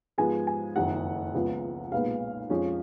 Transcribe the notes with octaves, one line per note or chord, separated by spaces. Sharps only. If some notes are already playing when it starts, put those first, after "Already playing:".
G#2 F3 G#3 B3 G#5
G#5
F#1 F2 D#3 F#5
C#2 C#3 F3 B3
B1 A#2 G#3 B3 F5
F2 F3 G#3 C#4